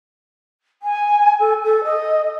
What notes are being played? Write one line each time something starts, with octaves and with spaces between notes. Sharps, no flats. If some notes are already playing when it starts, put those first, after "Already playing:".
G#5
A4
A4
D#5